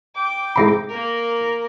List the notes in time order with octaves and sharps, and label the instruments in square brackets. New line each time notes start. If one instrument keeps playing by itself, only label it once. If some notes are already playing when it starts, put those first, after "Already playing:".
[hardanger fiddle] G5 D6
[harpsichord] G#2 C3 B5
[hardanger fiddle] A#3 A#4